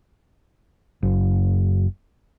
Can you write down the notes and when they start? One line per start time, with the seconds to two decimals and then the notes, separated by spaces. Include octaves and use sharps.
1.03 F#1